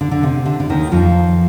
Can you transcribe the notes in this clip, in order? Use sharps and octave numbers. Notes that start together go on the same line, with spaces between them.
D3
D3
C3
D3
D3
D#2 D#3
F2 F3